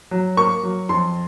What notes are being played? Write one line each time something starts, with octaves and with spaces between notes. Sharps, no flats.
F#3
A#3 C#6
F#3
F2 C6